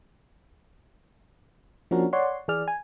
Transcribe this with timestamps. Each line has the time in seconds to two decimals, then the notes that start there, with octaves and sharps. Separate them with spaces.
1.91 F3 A#3 C#4 D4 F#4 A#4
2.13 C#5 D5 F#5 C6
2.48 E3 G#4 D5 F6
2.68 G#5